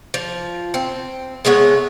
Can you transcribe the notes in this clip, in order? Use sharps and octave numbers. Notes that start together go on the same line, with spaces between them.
F3
C4
G#3 A3 B3 C#5